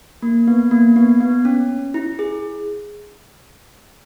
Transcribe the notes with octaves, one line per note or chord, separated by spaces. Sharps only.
A#3
B3
A#3
B3
B3
C#4
E4
G#4